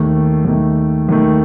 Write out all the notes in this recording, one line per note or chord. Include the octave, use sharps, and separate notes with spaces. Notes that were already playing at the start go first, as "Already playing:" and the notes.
Already playing: D#2 D#3 A3
D#2 D#3 A3
D#2 D#3 A3